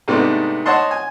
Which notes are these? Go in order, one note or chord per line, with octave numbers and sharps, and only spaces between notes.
G#2 C3 A3 B3 D4 D#4
C5 C#5 D#5 F#5 A5 C6
G#5